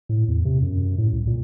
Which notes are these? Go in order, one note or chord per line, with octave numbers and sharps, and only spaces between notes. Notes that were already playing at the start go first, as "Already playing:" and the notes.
A2
E2
C3
F#2
A2
C2
A#2